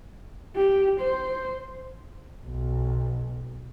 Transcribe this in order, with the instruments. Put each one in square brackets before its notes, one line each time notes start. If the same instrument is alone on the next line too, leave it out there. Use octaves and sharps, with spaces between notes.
[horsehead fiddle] G4
C5
[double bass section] B1